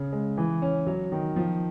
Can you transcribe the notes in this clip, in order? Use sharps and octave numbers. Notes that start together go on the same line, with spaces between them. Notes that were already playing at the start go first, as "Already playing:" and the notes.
Already playing: C#3
G#3
E3
C#4
F#3
D#3
F3